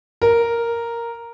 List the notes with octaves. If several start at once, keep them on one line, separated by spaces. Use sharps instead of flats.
A#4